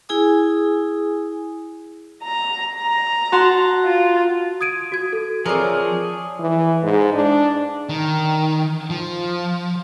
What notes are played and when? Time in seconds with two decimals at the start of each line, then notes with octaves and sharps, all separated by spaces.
0.09 E4 G#4 G#5 D#6
2.24 A#5
2.76 A#5
3.32 F#4 A5 C6
3.86 F4
4.61 D#6 G#6 D7 D#7
4.92 F#4 G#6
5.13 A4
5.46 F3 C4 G#4 A#4 C#5 D5 E5
6.40 E3
6.83 G#2
7.14 D4
7.89 D#3
8.90 F3